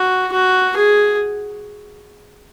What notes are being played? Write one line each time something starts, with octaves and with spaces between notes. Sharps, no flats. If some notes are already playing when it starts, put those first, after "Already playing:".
Already playing: F#4
F#4
G#4